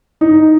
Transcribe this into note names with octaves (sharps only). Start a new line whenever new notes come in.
D#4